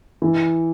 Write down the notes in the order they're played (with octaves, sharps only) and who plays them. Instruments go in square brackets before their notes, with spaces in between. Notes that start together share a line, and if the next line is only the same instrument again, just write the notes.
[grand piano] E3